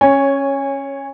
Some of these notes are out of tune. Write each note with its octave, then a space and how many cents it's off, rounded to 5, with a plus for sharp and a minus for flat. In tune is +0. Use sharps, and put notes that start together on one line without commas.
C#4 -15 C#5 +0 G#5 -20